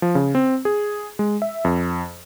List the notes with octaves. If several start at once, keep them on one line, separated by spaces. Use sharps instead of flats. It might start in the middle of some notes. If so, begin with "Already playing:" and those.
F3
C#3
C4
G#4
G#3
E5
F2